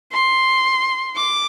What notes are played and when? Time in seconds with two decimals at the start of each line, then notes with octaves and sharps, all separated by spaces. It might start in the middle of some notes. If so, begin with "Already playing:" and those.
0.12 C6
1.16 D6